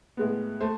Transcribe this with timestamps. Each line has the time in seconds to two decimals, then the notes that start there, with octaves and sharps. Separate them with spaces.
0.17 A2 G#3 B3
0.61 A3 C5